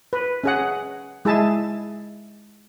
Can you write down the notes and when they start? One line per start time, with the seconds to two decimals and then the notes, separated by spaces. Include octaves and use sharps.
0.13 B4
0.44 C#4 G#4 F#5
1.25 G#3 E4 G#4 E5 A5